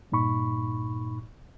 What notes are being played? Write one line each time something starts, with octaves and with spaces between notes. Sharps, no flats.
G2 A#2 D#4 B5 C#6